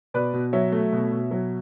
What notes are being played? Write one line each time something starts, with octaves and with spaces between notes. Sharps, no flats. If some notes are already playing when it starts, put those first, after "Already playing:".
B2 B4 D5
B2
F#3 C#5 E5
A3
B2
B2
F#3